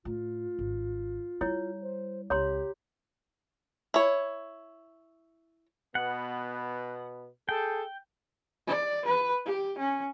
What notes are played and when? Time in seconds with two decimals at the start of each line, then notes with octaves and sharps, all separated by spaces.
0.05 A2 F4
0.59 G#1
1.41 G3 E4 C#5
1.82 C5
2.30 C#2 G4 C#5 A#5 C6
3.94 E4 C#5
5.95 B2 B3 F#5
7.49 G#4 A4 G5
8.67 D5
9.06 B4
9.46 G4
9.78 C#4